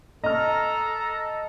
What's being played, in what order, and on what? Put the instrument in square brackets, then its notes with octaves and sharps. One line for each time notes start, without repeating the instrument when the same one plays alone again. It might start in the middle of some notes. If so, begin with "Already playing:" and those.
[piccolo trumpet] A4 [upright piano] D#5 F6 [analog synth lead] A#5